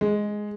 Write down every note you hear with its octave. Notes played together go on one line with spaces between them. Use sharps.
G#3